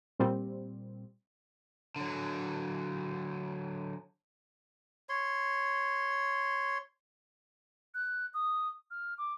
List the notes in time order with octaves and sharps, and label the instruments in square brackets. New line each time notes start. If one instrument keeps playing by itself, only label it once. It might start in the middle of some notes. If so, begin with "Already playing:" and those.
[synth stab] A#2 G3 C4
[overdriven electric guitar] D3 F#3
[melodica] C#5 C6
[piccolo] F#6
D#6
F6
D6